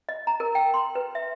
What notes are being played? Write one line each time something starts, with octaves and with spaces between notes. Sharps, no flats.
D#5
A#5
A#4
G5
C6
B4
E5